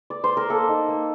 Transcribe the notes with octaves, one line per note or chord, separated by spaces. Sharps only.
D5
C5
A#4
A#3 A4
D#4
A#3